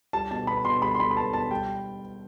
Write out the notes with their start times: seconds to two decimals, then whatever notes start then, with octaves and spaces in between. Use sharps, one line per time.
0.13 G3 A5
0.31 B2 A5
0.47 B3 B5
0.65 B2 C6
0.82 G3 B5
0.95 C6
0.99 B2 B5
1.11 B5
1.17 B3 A5
1.33 B2 A5
1.51 G3 G5